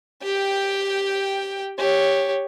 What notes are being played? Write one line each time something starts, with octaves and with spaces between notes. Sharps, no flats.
G4 G5
G4 C#5